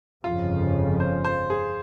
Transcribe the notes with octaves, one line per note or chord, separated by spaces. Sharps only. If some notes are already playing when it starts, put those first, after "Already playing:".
G1 F2 C#3 F3 F4
C5
C5
G#4